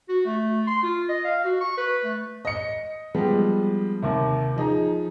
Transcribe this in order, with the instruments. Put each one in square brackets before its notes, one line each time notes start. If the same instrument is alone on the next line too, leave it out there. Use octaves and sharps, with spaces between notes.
[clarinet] F#4
A3
C6
F4
D#5
F5
F#4
C#6
B4
A3
[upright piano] D#5 C#7
F3 G3 G#3 B3
D#2 C3
F3 D#4 G#4 A#5